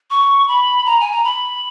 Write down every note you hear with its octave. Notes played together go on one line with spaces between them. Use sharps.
C#6
B5
A#5
G#5
A#5
B5